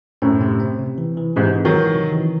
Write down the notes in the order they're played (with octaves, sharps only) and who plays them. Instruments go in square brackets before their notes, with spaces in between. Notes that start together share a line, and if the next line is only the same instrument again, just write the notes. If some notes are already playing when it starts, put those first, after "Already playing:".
[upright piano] F#2 A2 [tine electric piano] C4
[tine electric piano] C3
C4
C3
E3
E3
[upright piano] G#2 C3 [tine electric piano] E3
[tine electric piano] E3
[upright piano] D#3 F#3
[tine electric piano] E3
C3
E3